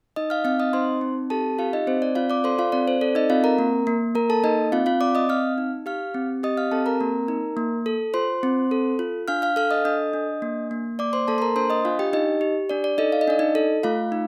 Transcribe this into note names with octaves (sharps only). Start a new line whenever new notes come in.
D#4 D#5 D#6
F5 F6
C4 F5 F6
D#5 D#6
D#4 C5 C6
C4
G4 A4 A5
F4 G4 F5
D#4 D#5
C4 C5
D5
C4 F4 F5
D5 D6
A4 C5 C6
F4 F5
C4 D5
C5
A4 D5
D#4 D#5
C4 F4 F5
A#4 A#5
A#3
A#3
A#3 A#4 A#5
A4 A5
A#3 D#4 D#5
C4 F4 F5
F4 F5
C4 D5 D6
D#5 D#6
C4 F5 F6
D#4
G4 F5 F6
C4
G4 D#5 D#6
F5 F6
C4 A4 A5
A#4 A#5
A#3
D#4
A#3
A4
F4 C5 C6
C4
A4
F4
D4 F5 F6
F5 F6
A4 F5 F6
D#5 D#6
D4 D#5 D#6
D4
A#3
A#3
A#3 D5 D6
C5 C6
A#3 A4 A5
C6
A#4 A#5
D4 C5 C6
D#5 D#6
D4 F4 F5
G4 G5
D#4 G4 D#5
G4
D4 D5
D5
D#4 A4 D#5
F5
D#5
D4 D5
D#4 D#5
A4
A3 F4 F5
D#4